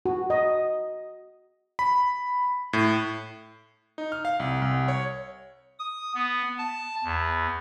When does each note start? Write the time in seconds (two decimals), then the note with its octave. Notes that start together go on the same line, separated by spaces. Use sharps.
0.06 F#4
0.30 D#5
1.79 B5
2.73 A2
3.98 D#4
4.12 F6
4.25 F5
4.40 C2
4.62 C2
4.88 C#5
5.79 D#6
6.15 B3
6.58 A5
7.04 E2